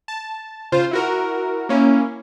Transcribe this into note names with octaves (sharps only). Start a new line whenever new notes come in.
A5
C#3 F4 C5
E4 F#4 A#4
A#3 C#4 E4